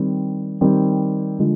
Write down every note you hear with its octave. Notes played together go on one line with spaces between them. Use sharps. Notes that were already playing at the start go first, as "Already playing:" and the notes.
Already playing: D#3 G3 C4
D#3 G3 C4
D3 F3 G#3